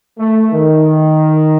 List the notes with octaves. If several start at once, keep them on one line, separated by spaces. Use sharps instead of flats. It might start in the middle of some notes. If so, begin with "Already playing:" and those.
A3
D#3